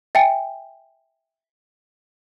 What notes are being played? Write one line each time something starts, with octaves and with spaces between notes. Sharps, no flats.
E5 G5 G#5